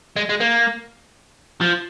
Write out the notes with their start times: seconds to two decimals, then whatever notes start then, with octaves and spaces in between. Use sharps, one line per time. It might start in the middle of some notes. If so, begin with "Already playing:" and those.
0.16 G#3
0.29 G#3
0.40 A#3
1.61 F3